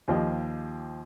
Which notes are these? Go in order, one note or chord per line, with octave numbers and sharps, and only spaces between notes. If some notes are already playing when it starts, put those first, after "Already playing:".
D#2 F3 G4 D#5